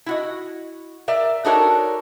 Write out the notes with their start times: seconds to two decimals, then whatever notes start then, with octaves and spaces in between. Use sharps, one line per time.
0.06 E4 F#4 D#5
1.08 A#4 D5 E5
1.45 D4 D#4 F#4 A4 A#4 C#5